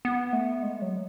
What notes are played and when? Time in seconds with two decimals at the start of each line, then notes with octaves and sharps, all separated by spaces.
0.05 B3
0.33 A3
0.63 G#3
0.82 F#3